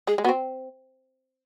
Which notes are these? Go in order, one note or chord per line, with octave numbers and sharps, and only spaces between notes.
G#3 G#4
G#3
B3 F#4
C4